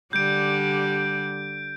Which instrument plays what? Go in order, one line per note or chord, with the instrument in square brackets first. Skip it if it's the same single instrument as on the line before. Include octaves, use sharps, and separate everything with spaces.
[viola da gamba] D3 G3 [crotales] G6 D7